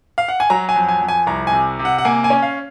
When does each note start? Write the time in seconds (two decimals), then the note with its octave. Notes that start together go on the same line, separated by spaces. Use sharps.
0.18 F5
0.28 F#5
0.40 G#5
0.50 F#3 A#5
0.69 G#5
0.76 F2
0.88 G#5
1.01 F2
1.08 G#5
1.27 C2 A#5
1.47 G#5
1.52 C3
1.79 C3
1.85 F#5
1.98 F#5
2.05 A#3 G#5
2.24 G#5
2.30 C#4
2.43 F5